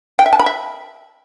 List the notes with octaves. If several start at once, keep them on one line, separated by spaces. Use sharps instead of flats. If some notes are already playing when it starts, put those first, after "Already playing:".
G5
E5
A5
B5
E5